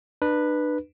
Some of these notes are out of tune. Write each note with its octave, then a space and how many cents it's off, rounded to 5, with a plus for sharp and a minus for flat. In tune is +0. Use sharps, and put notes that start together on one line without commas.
D4 +40 B4 -5